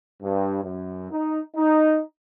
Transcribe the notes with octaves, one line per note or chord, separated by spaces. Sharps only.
G2
F#2
D#4
D#4